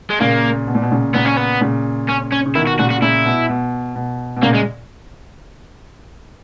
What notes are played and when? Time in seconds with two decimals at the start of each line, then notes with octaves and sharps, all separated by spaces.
0.10 G#3
0.20 A#2 C#3 A#3
0.67 B2
0.75 A#2
0.82 B2
0.91 A#2 C#3
1.14 A#2 C#3 B3
1.26 C#4
1.37 B3
1.61 A#2 C#3
2.09 C#4
2.32 C#4
2.46 C#3
2.55 B2 D#3 E4
2.67 F#4
2.79 A#2 C#3 F#4
2.90 F#4
3.02 A#2 C#3 E4
3.25 B2
3.49 B2
3.96 B2
4.37 B2
4.42 A#2 C#3 A#3
4.55 G#3